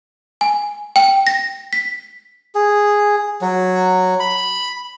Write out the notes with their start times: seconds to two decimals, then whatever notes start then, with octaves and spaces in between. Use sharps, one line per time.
0.41 G#5
0.96 G5
1.27 A#6
1.73 B6
2.55 G#4
3.41 F#3
4.20 B5